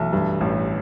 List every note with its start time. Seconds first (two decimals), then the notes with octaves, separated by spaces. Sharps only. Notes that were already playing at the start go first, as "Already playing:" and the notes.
Already playing: B1 E3 A3
0.13 G2
0.41 A1